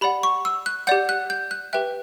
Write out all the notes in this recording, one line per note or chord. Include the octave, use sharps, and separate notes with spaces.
G4 D5 F#5 B5
C#6
E6
F#6
G4 D5 F#5 G6
F#6
G6
F#6
G4 B4 E5 G5 F#6